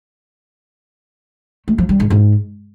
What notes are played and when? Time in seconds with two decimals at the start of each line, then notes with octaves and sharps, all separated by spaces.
1.68 A3
1.78 F3
1.89 G3
2.00 G#2
2.10 G#2